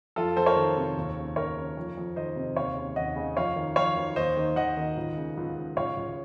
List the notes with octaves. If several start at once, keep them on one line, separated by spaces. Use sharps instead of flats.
F2 F4 A4
F2 A4 C5
A#4 C#5
D#3
C3
D#2
C#3
D#2 A#4 C#5
C#3
F2
F2
D#3 C5 D#5
C3
D#2 C#5 F5
C#3
D#2 D#5 F#5
C#3
F2 C#5 F5
D#3
F2 C#5 F5
D#3
D#2 C5 D#5
D#3
D#2 D#5 F#5
D#3
C#2
C#3
C#2
C#3
C#2 C#5 F5
C#2